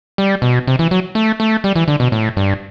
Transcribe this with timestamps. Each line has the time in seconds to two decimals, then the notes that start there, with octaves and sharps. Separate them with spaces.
0.18 G3
0.42 B2
0.67 C3
0.79 E3
0.91 F#3
1.15 A3
1.40 A3
1.64 G3
1.76 E3
1.88 D3
2.00 B2
2.12 A2
2.37 G2